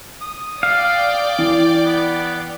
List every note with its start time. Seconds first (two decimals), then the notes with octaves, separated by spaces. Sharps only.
0.21 D#6
0.63 D5 F5 G5
1.38 E3
1.85 B3